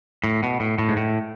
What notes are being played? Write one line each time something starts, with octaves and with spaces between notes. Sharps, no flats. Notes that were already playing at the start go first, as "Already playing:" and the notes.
A2
B2
A2
A2
G#2
A2